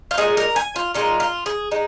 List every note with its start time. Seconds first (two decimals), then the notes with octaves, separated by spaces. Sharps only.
0.11 F4
0.17 A#2 G#3 D#4 G#4
0.37 A#4
0.56 G#5
0.76 F4
0.94 A#2 G#3 D#4 F4
1.20 F4
1.46 G#4
1.71 G#3 D#4